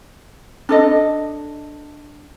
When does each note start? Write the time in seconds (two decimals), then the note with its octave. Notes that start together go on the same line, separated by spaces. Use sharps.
0.69 D4 A4 D#5